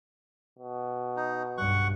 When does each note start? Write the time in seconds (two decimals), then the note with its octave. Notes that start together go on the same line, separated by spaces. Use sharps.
0.59 B2
1.17 D#4
1.58 B1 G2 F#5 C#6